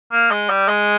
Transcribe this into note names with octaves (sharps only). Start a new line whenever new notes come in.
A#3
G#3
G3
G#3